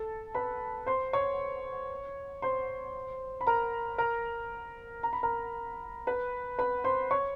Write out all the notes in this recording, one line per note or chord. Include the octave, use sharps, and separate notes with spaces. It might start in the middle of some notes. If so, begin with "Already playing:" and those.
Already playing: A4 A5
B4 B5
C5 C6
C#5 C#6
C5 C6
B5
A#4 A#5
A#4 A#5
A#5
B5
A#4 A#5
B4 B5
B4 B5
C5 C6
C#5 C#6